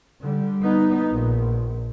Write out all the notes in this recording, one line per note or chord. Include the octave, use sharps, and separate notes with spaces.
D3 G3
B3 D#4
A#1